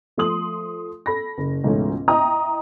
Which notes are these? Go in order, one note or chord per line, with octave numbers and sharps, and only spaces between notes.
F3 A3 A4 C6 D#6 F#7
A4 B5 A#6
F#1
C#2 G#2 B2 E3 A3 C#4
E4 D#5 E5 G5 A#5 D#6